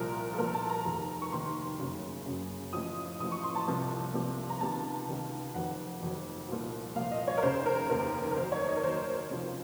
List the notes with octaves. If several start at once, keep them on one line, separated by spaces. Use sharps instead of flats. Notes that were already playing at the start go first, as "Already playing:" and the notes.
Already playing: C2 A#2 F3 A#4
A4
C2 A#2 F3 A#4
A5
A#5
F1 D#2 D#3
C#6
F1 D#2 D#3 C6
F#1 F#2 C#3
F#1 F#2 C#3
A1 A2 F3 D#6
A1 A2 F3 D#6
C#6
C6
A5
C2 C3 F3
C2 C3 F3
A#5
C#2 C3 D#3 A5
C#2 C3 D#3
F1 F2 D#3 F#3 F#5
F1 F2 D#3 F#3
C2 A#2 F3
C2 A#2 F3 F5
D#5
C#5
A#4
F1 D#2 C#3 C5
A#4
F1 D#2 C#3 A#4
A#4
D#2 D#3 F#3 C5
C#5
D#5
A#4
D#2 D#3 F#3 C5
C#2 C3 F3